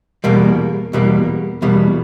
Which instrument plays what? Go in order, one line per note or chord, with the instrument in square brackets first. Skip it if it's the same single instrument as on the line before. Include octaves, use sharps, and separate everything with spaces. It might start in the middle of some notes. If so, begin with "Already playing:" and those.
[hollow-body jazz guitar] E2 B2 G3 A#3
E2 B2 G3 A#3
E2 B2 G3 A#3